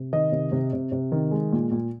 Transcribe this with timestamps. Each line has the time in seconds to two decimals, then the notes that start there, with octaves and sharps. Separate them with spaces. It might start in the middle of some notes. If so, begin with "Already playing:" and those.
Already playing: C3
0.13 D#3 D#5
0.32 C3
0.52 C3
0.73 C3
0.92 C3
1.12 D#3
1.31 G#3
1.52 A#2
1.71 A#2